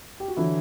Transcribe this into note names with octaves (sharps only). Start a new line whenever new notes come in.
G4
F#4
D3 E3 F#3 E4